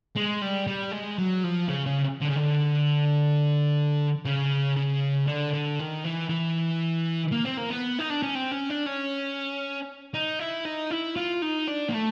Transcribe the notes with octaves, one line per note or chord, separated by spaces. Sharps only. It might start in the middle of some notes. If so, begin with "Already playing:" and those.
G#3
G3
G3
G#3
F#3
F3
C#3
C#3
D3
C#3
D3
C#3
C#3
D3
D3
D#3
E3
E3
A#3
C4
A#3
B3
D#4
D4
C#4
C4
C#4
D4
C#4
D#4
E4
D#4
E4
F4
D#4
D4
A#3
A3